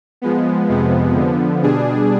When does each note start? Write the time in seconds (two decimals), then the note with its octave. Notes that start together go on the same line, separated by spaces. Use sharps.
0.22 F3 G#3 B3
0.69 F2 C3 F3 G#3 B3
1.16 D3 F3 B3
1.63 B2 G3 D4 G#4